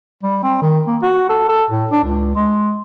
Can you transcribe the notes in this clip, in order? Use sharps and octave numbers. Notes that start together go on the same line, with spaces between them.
G3
C4
D#3
A#3
F#4
A4
A4
A2
D4
C#2
G#3